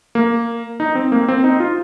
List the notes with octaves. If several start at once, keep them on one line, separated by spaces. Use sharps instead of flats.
A#3
D#4
C4
A#3
C4
D#4
F4